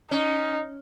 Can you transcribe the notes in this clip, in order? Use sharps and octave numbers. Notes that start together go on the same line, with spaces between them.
C#4 D#4